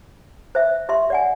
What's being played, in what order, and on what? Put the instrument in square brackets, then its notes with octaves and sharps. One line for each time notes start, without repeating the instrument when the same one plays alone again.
[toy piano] C5 E5
G4 E5 C6
D5 F#5 G#5